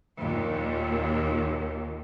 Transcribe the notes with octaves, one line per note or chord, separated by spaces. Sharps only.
D#2 A#2